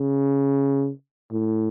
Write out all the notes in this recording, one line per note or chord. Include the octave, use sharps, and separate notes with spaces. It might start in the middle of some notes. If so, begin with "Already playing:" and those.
Already playing: C#3
A2